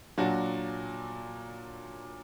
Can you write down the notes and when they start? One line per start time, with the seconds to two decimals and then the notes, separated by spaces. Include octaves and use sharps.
0.17 A#2 F#3 D4 F#4